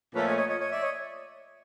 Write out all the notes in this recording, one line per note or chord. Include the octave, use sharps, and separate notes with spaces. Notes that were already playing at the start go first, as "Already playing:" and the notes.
A#2 F3 A3 C#4 A4 B4
C#5 D#5
C#5 D#5
C#5 D#5
C#5 D#5
D5 E5
C#5 D#5